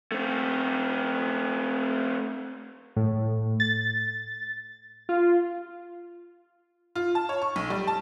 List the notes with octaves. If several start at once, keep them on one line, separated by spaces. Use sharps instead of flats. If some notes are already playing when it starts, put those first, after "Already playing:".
A3 C4
A2
A6
F4
F4
A5
C#5
C#6
B1
G3
A5